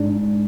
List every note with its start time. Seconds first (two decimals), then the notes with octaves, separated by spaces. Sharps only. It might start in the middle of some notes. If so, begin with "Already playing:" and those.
Already playing: G#2 D4